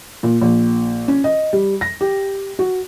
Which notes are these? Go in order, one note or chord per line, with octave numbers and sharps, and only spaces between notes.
A#2
A#1
C#4
D#5
G3
A#6
G4
F#4